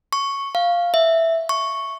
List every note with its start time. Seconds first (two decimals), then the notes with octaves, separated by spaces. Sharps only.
0.13 C#6
0.55 F5
0.94 E5
1.49 C#6